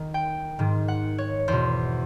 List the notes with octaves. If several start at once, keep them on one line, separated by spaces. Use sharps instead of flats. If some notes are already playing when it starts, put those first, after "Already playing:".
Already playing: D#3
G5
G#2 D#3
F#5
C#5
E2 B2 C5